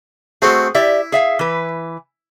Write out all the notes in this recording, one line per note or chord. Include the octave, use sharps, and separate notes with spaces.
A3 C4 F#4 G#4
E4 G4 D5 E5
G#4 E5 F5
E3 B4